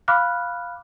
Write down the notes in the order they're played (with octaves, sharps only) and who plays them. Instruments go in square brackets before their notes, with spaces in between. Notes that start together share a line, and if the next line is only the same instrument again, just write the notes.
[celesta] F5 B5 D6 F6 F#6